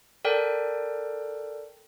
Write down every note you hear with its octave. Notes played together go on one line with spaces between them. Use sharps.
A4 A#4 D5 G5